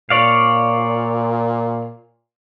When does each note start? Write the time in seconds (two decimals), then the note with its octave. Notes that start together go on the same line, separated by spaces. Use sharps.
0.10 A#2 C#5 D5 F5